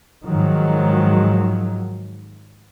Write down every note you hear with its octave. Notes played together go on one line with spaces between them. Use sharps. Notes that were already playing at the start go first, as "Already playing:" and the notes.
G#2 D#3 F3 F#3